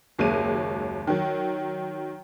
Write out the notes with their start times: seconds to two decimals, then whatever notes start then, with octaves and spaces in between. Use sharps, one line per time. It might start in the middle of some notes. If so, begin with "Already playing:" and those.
0.19 F#1 D#2 F#3 G#3 D#7
1.07 D#3 F#3